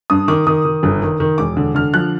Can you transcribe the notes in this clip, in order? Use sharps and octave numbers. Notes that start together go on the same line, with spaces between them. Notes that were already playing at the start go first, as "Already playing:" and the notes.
G2 D#6
D#3 D6
D#3 D#6
D#3
G1
D#3
D#3
E1 D6
D3
D3 F6
F3 F#6